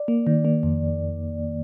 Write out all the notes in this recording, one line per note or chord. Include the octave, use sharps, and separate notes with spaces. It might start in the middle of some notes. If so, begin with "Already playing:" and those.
Already playing: D5
A#3
D#3
A#3
F2